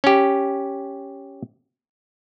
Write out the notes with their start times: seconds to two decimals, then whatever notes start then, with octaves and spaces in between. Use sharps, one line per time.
0.04 C#4 G4